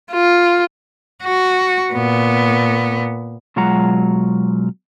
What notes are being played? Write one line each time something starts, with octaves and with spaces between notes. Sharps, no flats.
F4
F#4
A#2 B3
B2 F#3 G#3 F4 F#5 A#5